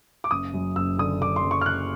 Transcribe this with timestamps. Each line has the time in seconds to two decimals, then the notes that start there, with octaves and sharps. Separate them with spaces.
0.24 D6
0.31 F#1 D#6
0.54 F#2
0.76 F#1 E6
0.98 D3 D#6
1.21 D3 D6
1.36 C6
1.43 F#1
1.51 C#6
1.61 F6
1.66 F#1 F#6